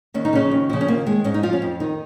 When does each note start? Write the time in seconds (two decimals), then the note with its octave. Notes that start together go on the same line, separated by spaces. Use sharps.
0.14 D#2 C#4
0.25 D#4
0.33 C#3 F3 C#4
0.51 D#2
0.70 C#3 F3
0.81 C#4
0.88 D#2 A#3
1.06 D#3 G#3
1.24 G#2 C#4
1.34 D#4
1.43 F3 F4
1.53 C#4
1.62 F2
1.80 D#3 D#4